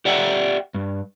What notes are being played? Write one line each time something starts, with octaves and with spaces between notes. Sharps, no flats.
G4 D5 E5 F#5 G5
G2